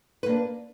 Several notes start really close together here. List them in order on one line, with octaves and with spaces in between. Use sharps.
B4 A#3 D4